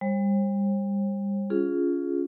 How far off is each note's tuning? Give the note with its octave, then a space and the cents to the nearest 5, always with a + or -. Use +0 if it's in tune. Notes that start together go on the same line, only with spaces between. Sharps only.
G3 +30 C5 +40
C#4 +25 F4 +0 G#4 +0